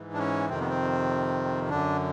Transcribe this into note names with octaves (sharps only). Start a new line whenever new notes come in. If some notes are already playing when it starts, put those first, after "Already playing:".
Already playing: G#2 E3
D4
C#4
F2 C3 D#3 C4
B3
C4
F#2 D3 D4